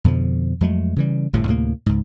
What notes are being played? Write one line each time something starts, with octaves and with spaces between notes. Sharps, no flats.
F2 B2 D3 F3
F2 F#3 G#3 A3
C#3 E3 G3
G1 F2 A2 C3
D2 A2 C3 A#3
C#2 G#2